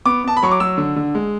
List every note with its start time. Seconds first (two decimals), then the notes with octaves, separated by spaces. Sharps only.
0.05 B3 D6
0.24 B3 A5
0.37 B5
0.43 F#3 C#6
0.52 D6
0.60 F#3 E6
0.78 D3
0.96 D3
1.15 G#3